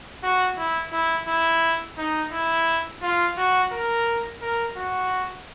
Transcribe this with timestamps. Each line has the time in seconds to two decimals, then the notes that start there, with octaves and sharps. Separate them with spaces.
0.23 F#4
0.58 E4
0.92 E4
1.27 E4
1.98 D#4
2.32 E4
3.02 F4
3.38 F#4
3.72 A#4
4.42 A#4
4.77 F#4